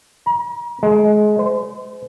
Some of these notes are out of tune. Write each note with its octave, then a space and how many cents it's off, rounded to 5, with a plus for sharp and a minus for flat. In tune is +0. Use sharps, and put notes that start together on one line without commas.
A#5 +40
G#3 +25
C5 -40